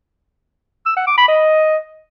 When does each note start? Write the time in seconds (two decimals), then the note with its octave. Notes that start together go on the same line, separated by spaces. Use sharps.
0.86 E6
0.97 F#5
1.07 D6
1.18 B5
1.29 D#5